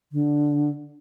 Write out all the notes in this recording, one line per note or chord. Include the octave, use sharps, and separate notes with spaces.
D3